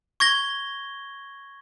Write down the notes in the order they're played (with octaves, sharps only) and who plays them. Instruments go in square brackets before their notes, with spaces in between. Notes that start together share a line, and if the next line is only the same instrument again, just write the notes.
[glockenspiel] C#6 G#6 A#6 G7